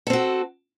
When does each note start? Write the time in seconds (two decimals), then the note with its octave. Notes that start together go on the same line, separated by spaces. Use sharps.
0.07 A4
0.10 C4
0.13 F#4